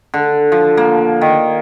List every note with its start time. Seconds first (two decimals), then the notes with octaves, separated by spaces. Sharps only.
0.14 D3
0.52 F3
0.77 A#3
1.21 D#3